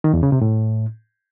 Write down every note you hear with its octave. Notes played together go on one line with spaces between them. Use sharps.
D#3
E2
C#3
C3
A2